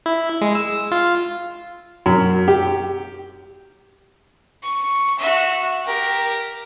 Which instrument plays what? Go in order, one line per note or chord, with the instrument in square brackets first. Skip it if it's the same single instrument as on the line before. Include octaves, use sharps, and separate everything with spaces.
[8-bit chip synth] E4
G#3
E6
F4
[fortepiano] F#2
G4
[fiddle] C#6
F#4 E5
G4 A#4